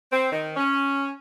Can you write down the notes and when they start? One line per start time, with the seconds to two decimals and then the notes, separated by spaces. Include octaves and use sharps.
0.12 C4
0.32 D#3
0.57 C#4